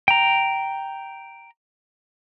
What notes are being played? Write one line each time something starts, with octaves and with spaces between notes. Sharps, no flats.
G5 A#5